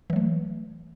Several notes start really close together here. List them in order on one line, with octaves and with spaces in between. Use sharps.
E3 F#3 A3